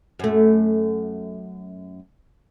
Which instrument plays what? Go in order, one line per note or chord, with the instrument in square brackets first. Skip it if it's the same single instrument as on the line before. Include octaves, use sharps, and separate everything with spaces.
[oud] F#2 A3